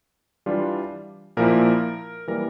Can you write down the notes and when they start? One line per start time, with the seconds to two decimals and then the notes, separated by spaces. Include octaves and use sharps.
0.46 E3 G3 D4 F4
1.37 A#2 F3 A#3 E4 A#4
2.28 E3 G3 A#3 A#4